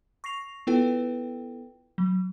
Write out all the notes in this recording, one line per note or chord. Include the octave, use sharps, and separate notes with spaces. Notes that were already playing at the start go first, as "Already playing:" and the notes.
C#6 A#6 C7 F7
B3 E4 F4 A4 B4 G5
F#3